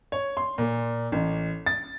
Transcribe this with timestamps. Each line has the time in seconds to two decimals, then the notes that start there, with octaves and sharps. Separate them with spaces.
0.12 C#5
0.37 C6
0.58 A#2
1.12 A1
1.66 A6